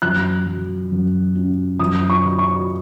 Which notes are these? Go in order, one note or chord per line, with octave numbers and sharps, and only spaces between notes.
F#2 F#6
F#3
F#2
C#4
F#2 D#6
C#6
D#3
C#6